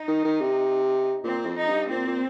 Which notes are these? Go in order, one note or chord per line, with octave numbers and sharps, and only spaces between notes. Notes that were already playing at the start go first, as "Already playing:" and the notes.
Already playing: D#4
D#3
D#3
C3
A#2 C4
F2
D#4
G2
A#2 C4
A#2